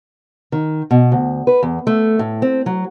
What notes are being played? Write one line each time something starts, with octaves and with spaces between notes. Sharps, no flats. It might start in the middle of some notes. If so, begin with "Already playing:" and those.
D#3
B2
D2
B4
E2
A3
A2
C4
F#3